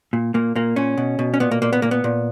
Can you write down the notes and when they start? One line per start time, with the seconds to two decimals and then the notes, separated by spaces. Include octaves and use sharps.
0.13 A#2
0.34 A#2 A#3
0.55 A#2 A#3
0.76 A#2 C#4
0.97 B2
1.19 B2
1.34 C#4
1.40 A#2 B3
1.51 A#3
1.62 A#2 A#3
1.73 B3
1.82 A#2 A#3
1.91 B3
2.04 A#2